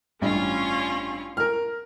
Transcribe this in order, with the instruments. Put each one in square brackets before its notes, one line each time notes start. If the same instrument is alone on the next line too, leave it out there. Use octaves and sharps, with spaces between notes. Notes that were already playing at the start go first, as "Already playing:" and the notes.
[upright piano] A1 G2 [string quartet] C#4 F4 C#6
[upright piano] A#4 F6